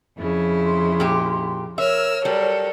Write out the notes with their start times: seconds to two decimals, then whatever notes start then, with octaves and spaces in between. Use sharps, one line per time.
0.18 F2 C#3 E4
0.64 C6
1.00 A#2 G4
1.78 A#4 C#5 E5 E6 F6
2.25 F#3 G3 A4 A#4